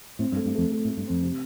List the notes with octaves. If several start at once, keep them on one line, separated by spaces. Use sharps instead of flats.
A2 C4
G2
A3
G2
F2 A3
A3
A2
A3
G2
F2 C4
C3